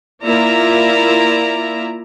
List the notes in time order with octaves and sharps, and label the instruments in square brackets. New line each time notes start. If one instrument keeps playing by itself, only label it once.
[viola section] A#3 E4 F4 D5 E5 A#5